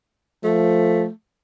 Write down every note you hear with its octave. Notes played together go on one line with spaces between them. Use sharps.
F3 A3